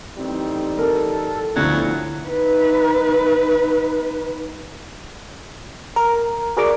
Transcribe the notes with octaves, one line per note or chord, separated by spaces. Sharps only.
A1 G3 C4 D#4
A4 A#4
D2 F3 F#3 B3 D4 E4
D#4 B4
A#4
F#4 G#4 A#4 D5 A#5 D6